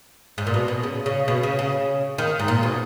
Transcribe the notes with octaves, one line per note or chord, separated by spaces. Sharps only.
G#2
A#2
B2
B2
C#3
C#3
B2
C#3
C#3
D#3
G#2
A#2
B2